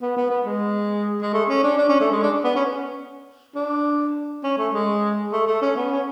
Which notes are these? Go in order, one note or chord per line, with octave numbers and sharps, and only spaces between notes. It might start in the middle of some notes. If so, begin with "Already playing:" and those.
B3
B3
B3
G#3
G#3
A3
C#4
D4
D4
C#4
A3
G#3
D4
B3
C#4
D4
C#4
A3
G#3
A3
A3
C#4
B3
C#4